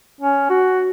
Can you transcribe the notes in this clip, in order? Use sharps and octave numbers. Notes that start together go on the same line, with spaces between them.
C#4
F#4